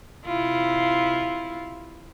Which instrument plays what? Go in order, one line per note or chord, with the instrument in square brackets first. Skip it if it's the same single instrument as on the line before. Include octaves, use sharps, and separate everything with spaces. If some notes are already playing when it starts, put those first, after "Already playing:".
[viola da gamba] C3 E4 F4